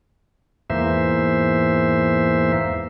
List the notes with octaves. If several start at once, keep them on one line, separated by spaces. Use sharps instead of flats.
E2 G#2 E3 A#3 C5 E5